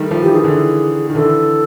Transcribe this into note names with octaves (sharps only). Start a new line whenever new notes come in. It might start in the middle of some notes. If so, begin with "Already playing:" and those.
Already playing: D#3 G3 A3
F3
E3 G4
D#3 G#4
D3 E3
D#3
D3 E3 A4